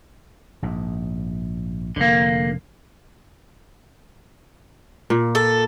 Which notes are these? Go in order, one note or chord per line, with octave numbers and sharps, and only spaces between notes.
A#1 G#2
F1 D3 A#3
A#2
A4